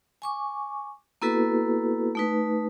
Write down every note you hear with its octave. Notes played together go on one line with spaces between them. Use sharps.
G#5 C#6 D6
A#3 B3 E4 F#4 A4 B4
A3 D#4 B4